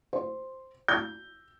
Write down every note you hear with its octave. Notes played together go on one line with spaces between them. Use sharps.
C5
G6